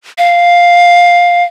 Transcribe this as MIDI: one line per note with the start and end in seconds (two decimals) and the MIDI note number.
0.18 1.44 77